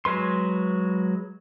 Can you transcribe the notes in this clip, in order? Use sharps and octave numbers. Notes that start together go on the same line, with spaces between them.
F#3 G#3 B4 C6